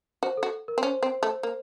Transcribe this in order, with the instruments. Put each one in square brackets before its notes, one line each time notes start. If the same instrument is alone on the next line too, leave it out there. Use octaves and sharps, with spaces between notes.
[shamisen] F#4 [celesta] C5
[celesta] A4
[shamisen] F#4
[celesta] A#4
[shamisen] C4
[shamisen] C#4 [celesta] C5
[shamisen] C4
A3
A#3